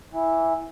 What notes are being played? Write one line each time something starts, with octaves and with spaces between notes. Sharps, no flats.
E3